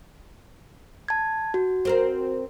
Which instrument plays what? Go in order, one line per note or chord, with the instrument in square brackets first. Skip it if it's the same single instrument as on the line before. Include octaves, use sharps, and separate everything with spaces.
[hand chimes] A5 G#6
F#4
[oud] C4 A#4 C5